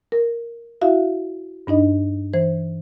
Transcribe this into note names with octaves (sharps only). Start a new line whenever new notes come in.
A#4
E4 F#4 E5 F5
G2 D4 D#4 D#5
E3 C5